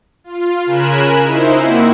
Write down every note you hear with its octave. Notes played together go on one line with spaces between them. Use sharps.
F4
C#3 A#4 G#5 B5 F#6 E7
D#4 E4 C5
A#3 C4 E4 F#4